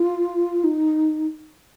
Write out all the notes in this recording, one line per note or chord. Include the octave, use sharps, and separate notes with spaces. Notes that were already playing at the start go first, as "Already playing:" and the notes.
Already playing: F4
D#4